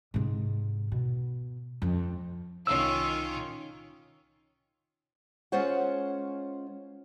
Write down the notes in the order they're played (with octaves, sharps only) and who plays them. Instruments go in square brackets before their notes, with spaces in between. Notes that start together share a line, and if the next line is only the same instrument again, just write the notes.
[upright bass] G#2 C3
B2
F2
[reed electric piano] C2 E6 [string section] D#3 C#4 F4
[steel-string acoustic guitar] G#3 C#4 F4 C5 C#5 F#5